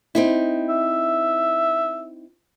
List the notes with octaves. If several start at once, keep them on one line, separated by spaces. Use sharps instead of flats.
C4 D#4 E4
E5